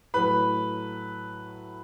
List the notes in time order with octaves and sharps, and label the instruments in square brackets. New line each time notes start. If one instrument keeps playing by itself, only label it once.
[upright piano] A2 F#3 A3 B4 B5